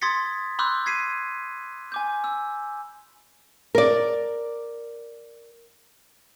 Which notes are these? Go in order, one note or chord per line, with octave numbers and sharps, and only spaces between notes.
C6 D#6 G#6 A6 B6 C#7
B5 C6 D6 E6 F#6 G6
G#6 B6 C7 D#7
G#5 D6 G6
E6
A#4 D5